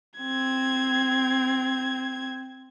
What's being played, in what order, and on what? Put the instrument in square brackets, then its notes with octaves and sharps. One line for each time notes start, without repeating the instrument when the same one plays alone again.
[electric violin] C4 G#6